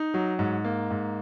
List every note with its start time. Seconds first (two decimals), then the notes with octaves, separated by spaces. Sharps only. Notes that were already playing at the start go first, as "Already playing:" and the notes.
Already playing: D#4
0.14 F#3
0.39 G#2
0.65 A#3
0.91 G#2